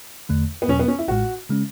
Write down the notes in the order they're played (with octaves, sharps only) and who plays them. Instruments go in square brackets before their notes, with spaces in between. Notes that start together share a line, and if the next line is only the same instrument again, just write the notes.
[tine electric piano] E2 D3 A3
[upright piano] B3
[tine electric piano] E2 B2 F#3 [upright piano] C#4
[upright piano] B3
C#4
E4
[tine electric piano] A1 A2 G#3 [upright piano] F#4
[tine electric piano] C#3 G#3 C#4